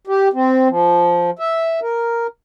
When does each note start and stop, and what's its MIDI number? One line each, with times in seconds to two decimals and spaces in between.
0.07 0.28 67
0.33 0.68 60
0.69 1.30 53
1.39 1.80 76
1.82 2.27 70